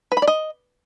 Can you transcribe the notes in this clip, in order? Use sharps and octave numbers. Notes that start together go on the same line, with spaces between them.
B4
B5
D5
D#5